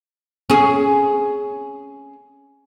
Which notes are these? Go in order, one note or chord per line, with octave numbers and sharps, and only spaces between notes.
C#4 G#4